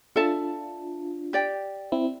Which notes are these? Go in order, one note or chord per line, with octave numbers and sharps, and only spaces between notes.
D4 F4 A4 E5 A5
G4 D5 G5
C4 E4